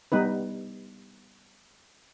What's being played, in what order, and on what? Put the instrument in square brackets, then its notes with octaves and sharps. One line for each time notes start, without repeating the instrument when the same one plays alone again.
[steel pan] G3 B3 D#4 B4